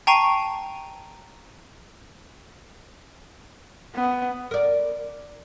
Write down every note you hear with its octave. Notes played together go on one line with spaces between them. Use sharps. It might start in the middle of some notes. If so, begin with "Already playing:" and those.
G5 A5 A#5 C#6 C7 D#7
B3
A#4 D5